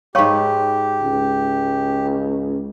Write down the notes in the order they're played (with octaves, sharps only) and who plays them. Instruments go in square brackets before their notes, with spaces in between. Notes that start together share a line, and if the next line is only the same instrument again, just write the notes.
[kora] G#2 B4 [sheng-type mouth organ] G4 [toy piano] C#5 F5 C#6
[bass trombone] C#2